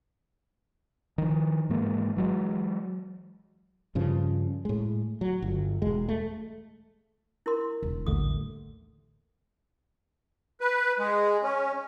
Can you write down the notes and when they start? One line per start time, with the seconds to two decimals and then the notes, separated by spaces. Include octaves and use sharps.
1.18 D#3 F3
1.69 G#2 E3 G#3 A#3
2.16 E3 F#3 G#3
3.95 G2 C#3 F3
4.65 A2 G#3
5.21 F#3
5.42 G1
5.82 E1 G#3
6.08 A3
7.46 E4 A#4 C6
7.83 E1
8.06 A1 D#2 D3 G3 A3 D#6
10.61 B4
10.99 G#3
11.43 C#4